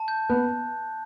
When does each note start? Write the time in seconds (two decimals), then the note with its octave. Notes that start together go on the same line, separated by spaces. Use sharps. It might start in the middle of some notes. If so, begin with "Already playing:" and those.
Already playing: A5
0.08 G6
0.30 B3 F#6